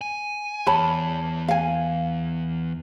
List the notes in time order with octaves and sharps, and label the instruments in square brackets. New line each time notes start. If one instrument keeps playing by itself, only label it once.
[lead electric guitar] G#5
[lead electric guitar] E2 [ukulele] C#5 A5 B5
[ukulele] F5 G#5